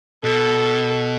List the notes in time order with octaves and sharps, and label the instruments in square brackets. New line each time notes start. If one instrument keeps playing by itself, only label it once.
[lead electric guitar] B2 [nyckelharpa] A4